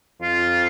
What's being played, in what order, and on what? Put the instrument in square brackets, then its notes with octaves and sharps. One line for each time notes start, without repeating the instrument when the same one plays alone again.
[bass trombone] F2 [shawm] F4